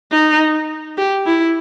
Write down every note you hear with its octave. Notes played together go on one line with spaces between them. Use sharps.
D#4
G4
E4